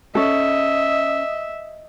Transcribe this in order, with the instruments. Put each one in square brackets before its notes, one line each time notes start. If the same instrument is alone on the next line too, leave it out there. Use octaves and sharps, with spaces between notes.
[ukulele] C#4 A4 [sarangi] D#5 [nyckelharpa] E5